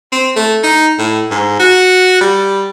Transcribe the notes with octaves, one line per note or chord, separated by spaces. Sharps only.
C4
A3
D#4
A2
G#2
F#4
G3